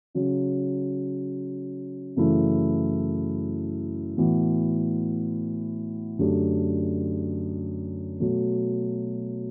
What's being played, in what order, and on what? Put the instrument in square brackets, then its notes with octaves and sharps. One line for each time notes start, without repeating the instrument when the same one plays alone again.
[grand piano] C#3 F#3 C#4
F#2 C#3 E3 A3 E4
A2 E3 B3 F#4
F#2 D3 A3 D4 G4
B2 F#3 A3